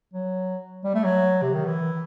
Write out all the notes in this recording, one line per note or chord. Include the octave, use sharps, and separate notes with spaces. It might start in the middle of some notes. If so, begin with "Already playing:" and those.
F#3
G3
A3
F#3
C3
D#3
E3